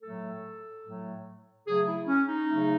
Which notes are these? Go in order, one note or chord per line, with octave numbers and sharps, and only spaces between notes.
A2 F#3 A3 A4
A2 F#3 A3
C#3 F#3 A3 G#4
E4
C#4
D#4
C#3 F#3 A3